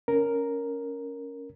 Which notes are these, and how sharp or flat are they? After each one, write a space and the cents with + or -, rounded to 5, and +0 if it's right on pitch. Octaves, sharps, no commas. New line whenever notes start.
C#4 +10 A#4 +0